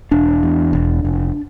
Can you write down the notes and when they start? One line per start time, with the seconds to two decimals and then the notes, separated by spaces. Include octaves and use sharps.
0.11 E1 D4
0.43 E2
0.73 E1
1.05 F1